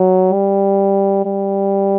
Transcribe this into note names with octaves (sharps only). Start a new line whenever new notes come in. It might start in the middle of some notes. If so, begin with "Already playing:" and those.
Already playing: F#3
G3
G3